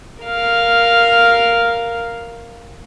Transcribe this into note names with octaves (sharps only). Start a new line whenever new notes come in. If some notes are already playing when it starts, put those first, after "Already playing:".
A#4 F5